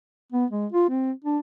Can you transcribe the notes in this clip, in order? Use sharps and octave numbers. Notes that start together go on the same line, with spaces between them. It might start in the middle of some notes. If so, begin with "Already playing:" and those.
B3
G#3
F4
C4
D4